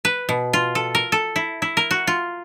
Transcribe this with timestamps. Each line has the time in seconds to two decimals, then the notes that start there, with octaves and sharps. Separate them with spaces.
0.05 B4
0.29 B2
0.53 F4
0.75 A4
0.95 A#4
1.12 A4
1.36 E4
1.62 E4
1.77 A#4
1.91 F#4
2.07 F4